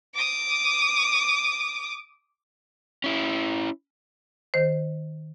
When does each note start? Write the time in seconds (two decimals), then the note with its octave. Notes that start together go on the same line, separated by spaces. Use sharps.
0.14 D6 D#6
3.04 C#4 E4
4.54 D#3 C5